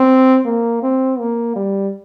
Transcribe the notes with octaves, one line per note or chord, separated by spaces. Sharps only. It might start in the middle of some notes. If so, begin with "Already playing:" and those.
Already playing: C4
A#3
C4
A#3
G3